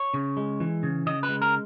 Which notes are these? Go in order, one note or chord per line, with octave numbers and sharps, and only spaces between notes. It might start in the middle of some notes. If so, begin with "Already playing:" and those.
Already playing: C#5
C#3
G#3
E3
C#3
C#3 D#5
B4
G#3
A#4